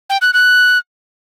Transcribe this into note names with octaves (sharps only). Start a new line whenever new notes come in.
G5
F#6
F#6